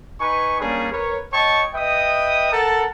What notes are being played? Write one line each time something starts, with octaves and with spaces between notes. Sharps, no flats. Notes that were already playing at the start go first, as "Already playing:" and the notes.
D#4 B4 G#5 C#6
G3 A#3 C#4 D4 G#4
A#4 B4 C#5
C#5 D#5 G5 A5 C#6
B4 D#5 E5 G5 D#6
A4 A#4 F#5 A5